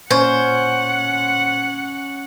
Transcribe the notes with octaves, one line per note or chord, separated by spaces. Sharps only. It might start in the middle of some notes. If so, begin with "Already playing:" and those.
A#2 C#4 C5 F#5 G#5